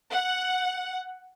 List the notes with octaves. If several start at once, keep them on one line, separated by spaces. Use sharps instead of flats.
F#5